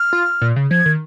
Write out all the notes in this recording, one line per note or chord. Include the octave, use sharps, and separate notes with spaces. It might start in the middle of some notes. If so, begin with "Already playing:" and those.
Already playing: F6
F4
A#2
C#3
F3 G#6
D#3